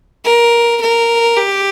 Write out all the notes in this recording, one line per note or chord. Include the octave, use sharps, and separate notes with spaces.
A#4
A#4
G4